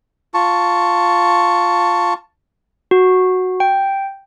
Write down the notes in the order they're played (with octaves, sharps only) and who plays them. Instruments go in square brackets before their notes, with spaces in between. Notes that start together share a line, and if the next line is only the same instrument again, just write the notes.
[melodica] F4 A5 C#6
[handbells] F#4
G5